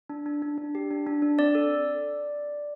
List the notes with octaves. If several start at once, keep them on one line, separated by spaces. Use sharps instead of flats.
D4
D4
D4
D4
G4
D4
D4
D4
C4 D5
A4